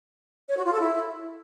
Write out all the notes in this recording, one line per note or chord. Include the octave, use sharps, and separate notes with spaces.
C#5
F#4
F4
A4
E4